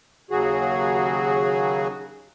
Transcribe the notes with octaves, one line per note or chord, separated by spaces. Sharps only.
D#2 C#3 F#3 F#4 G#4